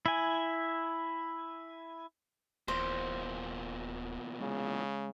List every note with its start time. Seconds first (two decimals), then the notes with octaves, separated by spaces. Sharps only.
0.06 E4 G#5
2.68 D#1 E2 A#2 C5
4.40 C#3 G#3